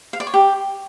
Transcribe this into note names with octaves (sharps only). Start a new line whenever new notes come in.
F5
D5
C#5
G4